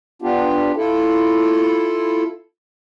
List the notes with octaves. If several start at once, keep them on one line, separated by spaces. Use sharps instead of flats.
B3 D4 F4 G4
E4 F4 A4